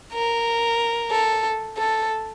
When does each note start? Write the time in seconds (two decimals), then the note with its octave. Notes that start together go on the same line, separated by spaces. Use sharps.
0.13 A#4
1.11 A4
1.78 A4